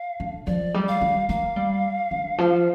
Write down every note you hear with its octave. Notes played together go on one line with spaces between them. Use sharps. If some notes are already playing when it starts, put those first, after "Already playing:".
Already playing: F5
D3
F3 D5
G3
F5
G3
A#3 F5
G3
D3
F3